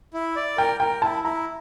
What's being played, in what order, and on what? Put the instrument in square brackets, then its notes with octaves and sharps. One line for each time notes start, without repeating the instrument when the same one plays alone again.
[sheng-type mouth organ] E4
D5
[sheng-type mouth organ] A#4 [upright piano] G5
[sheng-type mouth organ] A#4 [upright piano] G5
[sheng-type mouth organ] E4 [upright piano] A5
[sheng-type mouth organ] E4 [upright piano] A#5